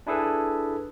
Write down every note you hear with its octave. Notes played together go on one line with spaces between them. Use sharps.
D4 E4 G#4 A4 B4